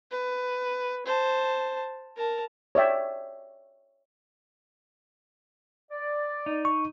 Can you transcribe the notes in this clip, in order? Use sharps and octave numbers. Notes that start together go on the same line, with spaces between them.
B4
C5 A5
A#4 A5
C#5 D5 E5 G5
D5
D#4
C#6